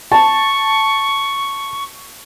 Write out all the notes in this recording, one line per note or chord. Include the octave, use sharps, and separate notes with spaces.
A5 C#6